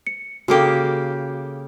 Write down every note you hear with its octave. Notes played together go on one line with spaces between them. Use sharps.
C#7
C#3 A#3 F#4 G4 A4